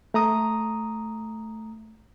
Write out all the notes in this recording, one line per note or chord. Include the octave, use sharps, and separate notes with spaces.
A3 A#5 D#6